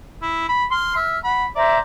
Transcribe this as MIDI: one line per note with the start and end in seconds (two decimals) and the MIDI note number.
0.22 0.48 64
0.49 0.65 83
0.71 0.93 84
0.71 1.22 89
0.96 1.18 76
1.24 1.46 78
1.24 1.47 83
1.55 1.78 72
1.55 1.79 74
1.55 1.78 76
1.55 1.78 82